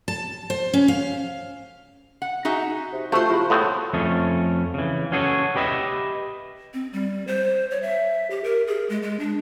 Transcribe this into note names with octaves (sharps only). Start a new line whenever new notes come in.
A5
C5
C#4
F5
F#5
D#4 F#4 G#4 E5
C3
C3 A3 F4 F#4 C5 G6
F3 E4 G#4 B5
A2 A3 B3 C4
F2 A3 C#4
C#3 E3
C#4 F#4 G#4 A4 C#5
G4 B4 D#5 E5
C4
G3
C5
C#5
E5
G4
A#4
G#4
G#3
G#3
D4